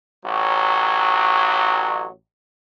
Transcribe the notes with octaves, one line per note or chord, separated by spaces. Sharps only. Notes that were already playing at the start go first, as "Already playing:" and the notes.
A1 F#3